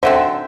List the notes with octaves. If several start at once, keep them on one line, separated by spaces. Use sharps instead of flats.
D3 F#3 C4 C5 E5